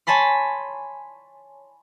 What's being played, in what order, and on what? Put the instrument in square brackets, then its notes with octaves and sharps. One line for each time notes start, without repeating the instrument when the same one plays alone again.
[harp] C#5 G#5 A5 B5 C6